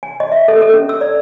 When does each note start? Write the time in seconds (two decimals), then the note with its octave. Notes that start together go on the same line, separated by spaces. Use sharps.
0.03 G#5
0.20 D#5
0.32 E5
0.48 A4
0.61 A4
0.73 C#4
0.89 E6
1.01 D5